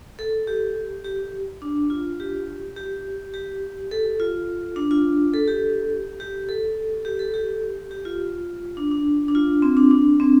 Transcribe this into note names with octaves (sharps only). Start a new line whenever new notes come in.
A4
G4
G4
D4
F4
G4
G4
G4
A4
F4
D4
F4
A4
G4
G4
A4
G4
A4
G4
G4
F4
D4
D4
D4
F4
C4
D4
D4
C4